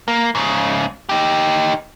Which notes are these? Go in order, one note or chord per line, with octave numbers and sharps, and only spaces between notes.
A#3
G#2 C#3
D#4 G4